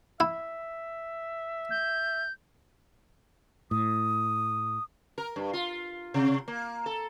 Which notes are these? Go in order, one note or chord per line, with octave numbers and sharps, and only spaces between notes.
E4 E5
G6
A2 D#6
A#4
G2
F4
C3
A#3
A4